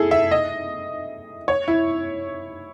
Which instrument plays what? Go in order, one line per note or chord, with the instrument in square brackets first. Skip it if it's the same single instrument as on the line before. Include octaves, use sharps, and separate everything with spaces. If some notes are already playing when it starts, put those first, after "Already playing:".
Already playing: [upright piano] E4 G#4 A4
E5
D#5
C#5
E4